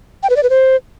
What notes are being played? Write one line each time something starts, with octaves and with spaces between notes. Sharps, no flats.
G5
B4
D5
B4
C5